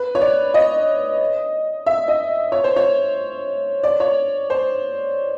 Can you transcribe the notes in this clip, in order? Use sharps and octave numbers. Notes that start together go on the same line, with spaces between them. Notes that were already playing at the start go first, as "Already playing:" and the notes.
Already playing: B4
C#5
D5
D#5
E5
D#5
C#5
C5
C#5
D5
C#5
C5